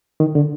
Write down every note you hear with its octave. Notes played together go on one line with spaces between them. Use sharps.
D#3
D3